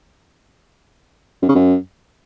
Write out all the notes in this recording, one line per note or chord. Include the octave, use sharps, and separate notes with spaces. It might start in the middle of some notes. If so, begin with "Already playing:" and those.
F#2
C#3
F#2